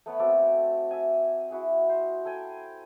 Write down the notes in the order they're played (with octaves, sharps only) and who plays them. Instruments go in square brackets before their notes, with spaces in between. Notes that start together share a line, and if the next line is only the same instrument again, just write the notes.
[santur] A3 B3 C#5 B5
C4 F#4 A4 D6
E5 G#5
E4 F#4 G#4
C5
A4 G5 G#5